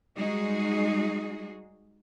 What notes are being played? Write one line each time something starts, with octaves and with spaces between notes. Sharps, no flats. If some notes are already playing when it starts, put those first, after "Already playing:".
G3 G#3 D#4 F#4 G#4